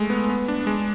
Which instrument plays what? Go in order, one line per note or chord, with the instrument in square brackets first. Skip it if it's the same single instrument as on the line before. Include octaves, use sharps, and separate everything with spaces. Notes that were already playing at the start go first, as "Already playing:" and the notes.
Already playing: [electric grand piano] G#3 A3
B3
B3
D4
G#3